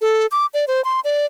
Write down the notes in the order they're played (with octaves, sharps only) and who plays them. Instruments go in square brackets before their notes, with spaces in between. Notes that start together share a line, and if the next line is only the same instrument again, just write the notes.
[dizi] A4
D6
D5
C5
C6
D5